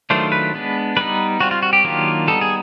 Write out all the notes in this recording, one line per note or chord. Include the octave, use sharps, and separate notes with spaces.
D#3 F#3 A3 D4 F4 C5
B4
G#3 B3 D4
G3 B3 D#4 B4
G3 C4 F4 F#4
F4
F#4
G4
D#3 F#3 A#3 D4 F4
G3 B3 D#4 A4
G#4